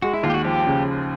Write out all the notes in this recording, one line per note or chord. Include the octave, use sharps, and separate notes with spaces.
G#3 F#4
E4
D#2 F4
G4
F#4
F3 G4
C#3